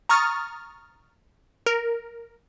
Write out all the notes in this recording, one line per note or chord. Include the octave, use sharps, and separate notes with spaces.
A#5 C#6 D#6 F6 A6
A#4